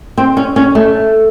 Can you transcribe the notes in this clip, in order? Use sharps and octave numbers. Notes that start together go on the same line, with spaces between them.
C4
C#4
C#4
A3